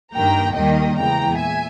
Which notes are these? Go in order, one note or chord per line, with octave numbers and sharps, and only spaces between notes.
G2 D#3 A#3 G5 A#5
D#2 D#3 G3 A#3 D#5 G5
E2 C#3 E3 G#3 G5 A#5
A#2 E5 G#5